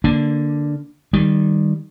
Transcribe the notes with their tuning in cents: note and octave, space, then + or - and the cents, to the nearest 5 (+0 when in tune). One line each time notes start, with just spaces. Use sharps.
D3 +0 A#3 -5 D4 +0
D#3 -10 G3 +0